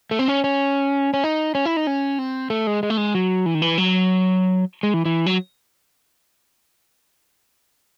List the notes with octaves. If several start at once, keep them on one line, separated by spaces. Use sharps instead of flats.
A3
C4
C#4
C#4
C#4
D#4
C#4
E4
D#4
C#4
C4
A3
G#3
G#3
A3
G#3
F#3
E3
D#3
E3
F#3
G#3
E3
E3
F#3